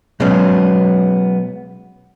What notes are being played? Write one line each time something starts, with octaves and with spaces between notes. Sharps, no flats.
B2 F#3 G#3 B3 C#4